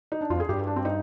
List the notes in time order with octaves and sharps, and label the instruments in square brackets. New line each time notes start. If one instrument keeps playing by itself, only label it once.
[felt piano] D#4
D4
[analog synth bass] F2 [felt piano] F4
[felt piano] G#4
[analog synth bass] G2 [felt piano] G4
[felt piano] D4
C4
D#4